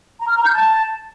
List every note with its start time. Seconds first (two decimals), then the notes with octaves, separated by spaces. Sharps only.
0.20 A#5
0.28 F6
0.37 A#5
0.45 G6
0.53 A5